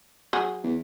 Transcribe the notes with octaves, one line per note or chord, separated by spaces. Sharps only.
F#3 G#4
E2